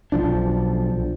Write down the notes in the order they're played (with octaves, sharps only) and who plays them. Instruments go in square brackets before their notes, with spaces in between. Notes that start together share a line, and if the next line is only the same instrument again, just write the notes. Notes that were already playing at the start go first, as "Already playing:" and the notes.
[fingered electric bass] B1 F3 D4